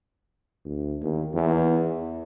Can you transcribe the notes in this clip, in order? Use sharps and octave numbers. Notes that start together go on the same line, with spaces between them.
D2
D#2
E2